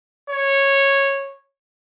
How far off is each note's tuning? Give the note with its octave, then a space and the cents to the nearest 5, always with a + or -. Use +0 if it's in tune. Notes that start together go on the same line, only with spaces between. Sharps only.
C#5 -10